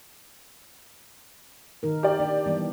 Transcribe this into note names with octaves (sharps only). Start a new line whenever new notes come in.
D#3 D#4 A#4
G4 D5
A#3 D4
E3 G3 B3